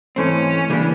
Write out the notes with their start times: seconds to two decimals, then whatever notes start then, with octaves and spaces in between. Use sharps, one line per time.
0.16 G#2 E3 A3 C4 C#4
0.69 C#3 E3 G3 A#3 D4